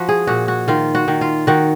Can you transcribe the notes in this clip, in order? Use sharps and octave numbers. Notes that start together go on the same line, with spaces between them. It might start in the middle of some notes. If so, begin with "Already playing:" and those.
Already playing: F3 F#4
G#4
A#2 F#4
F#4
D#3 F4
F#4
D#3
F4
D#3 F#4